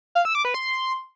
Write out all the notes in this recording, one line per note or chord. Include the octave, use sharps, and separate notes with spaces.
F5
E6
D6
B4
C6